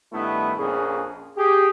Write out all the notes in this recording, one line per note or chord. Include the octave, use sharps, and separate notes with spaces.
G2 D#3 A3 B3 E4
A#1 F2 A#2 A#3 C#4 G#4
G4 G#4